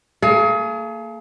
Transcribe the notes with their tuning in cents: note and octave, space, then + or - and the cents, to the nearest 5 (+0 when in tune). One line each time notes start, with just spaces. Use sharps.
A#3 -35 G#4 +35